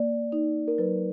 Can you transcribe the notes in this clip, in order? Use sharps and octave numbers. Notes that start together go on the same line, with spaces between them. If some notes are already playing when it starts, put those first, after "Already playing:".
Already playing: A#3 D5
D#4
A#4
F#3 B4